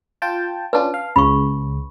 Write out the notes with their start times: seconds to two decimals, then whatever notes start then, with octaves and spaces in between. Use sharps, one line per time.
0.22 F4 G5 A5
0.73 C#4 D4 F4 B4 A5
0.94 F5
1.16 C#2 C#3 B5 C#6